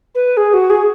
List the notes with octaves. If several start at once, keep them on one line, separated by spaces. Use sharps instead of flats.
B4
G#4
F#4
G#4